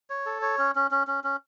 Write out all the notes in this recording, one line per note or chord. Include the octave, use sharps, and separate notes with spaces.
C#5
A4
C#5
C#4
C#4
C#4
C#4
C#4